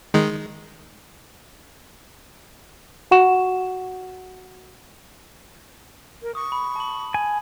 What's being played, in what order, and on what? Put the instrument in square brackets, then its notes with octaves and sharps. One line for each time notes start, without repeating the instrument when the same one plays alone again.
[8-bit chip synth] D#3 G#3
[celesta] F#4 F#5 C#6 E7
[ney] A#4
[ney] C#6 [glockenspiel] D#6
[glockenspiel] B5
A5 F#7
[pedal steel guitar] G#5